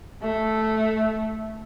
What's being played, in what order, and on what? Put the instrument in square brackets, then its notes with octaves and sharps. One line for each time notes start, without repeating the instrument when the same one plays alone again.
[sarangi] A3